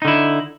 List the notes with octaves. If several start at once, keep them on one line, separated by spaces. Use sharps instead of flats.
D3 D#4 E4